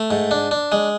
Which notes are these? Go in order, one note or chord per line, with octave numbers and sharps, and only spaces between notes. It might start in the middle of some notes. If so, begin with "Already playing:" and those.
Already playing: A3
G#2
D4
D4
G#3